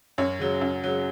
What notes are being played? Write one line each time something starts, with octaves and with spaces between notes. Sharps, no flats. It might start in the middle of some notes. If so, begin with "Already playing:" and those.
F#2 C#5
C#3 F#3
F#2
C#3 F#3